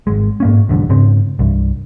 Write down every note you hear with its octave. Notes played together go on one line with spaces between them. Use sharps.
G#1 G#3
G#2 A#3 C#4
E1 A1 G2 D3
G#2 C#3 C4
C2 G2